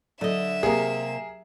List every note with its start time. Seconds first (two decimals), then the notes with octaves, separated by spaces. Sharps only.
0.21 D3 F#3 D4 A4 D#5 E5 E7
0.63 C3 A#3 G4 G#4 A#4 F5 D#6